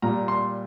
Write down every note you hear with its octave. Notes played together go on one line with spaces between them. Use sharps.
A#2 G3 A#5
C6